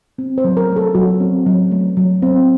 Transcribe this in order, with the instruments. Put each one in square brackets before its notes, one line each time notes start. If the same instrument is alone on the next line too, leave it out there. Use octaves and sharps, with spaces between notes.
[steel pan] C4
C5
F#3
A#4
A3
A4
F#3 F#4
C4
F#3
A3
F#3
C4